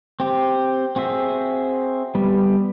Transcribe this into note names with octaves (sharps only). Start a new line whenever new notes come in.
C4 G4
C4 F#4 G#4 E5
G3 B3